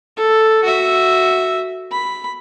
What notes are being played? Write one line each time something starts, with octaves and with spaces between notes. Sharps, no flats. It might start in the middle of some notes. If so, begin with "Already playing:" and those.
A4
F#4 E5
B5